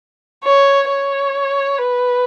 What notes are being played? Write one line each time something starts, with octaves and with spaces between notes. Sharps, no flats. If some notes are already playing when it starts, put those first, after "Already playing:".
C#5
C#5
B4